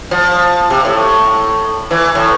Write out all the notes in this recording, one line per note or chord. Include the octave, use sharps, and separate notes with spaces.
F3
C3
A2
E3
A2